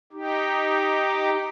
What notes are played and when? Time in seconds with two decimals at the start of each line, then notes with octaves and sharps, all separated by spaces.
0.13 D#4 G4